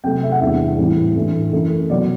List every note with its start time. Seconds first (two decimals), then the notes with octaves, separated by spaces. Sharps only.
0.04 C3 F#3 A3 G5
0.23 E5
0.32 F#5
0.41 E2 C3 G3 D4 E5
0.78 A2 E3 G3 C4 E4
1.15 A2 E3 A3 D4
1.52 F#2 E3 A3 E4
1.90 B2 F#3 B3 D5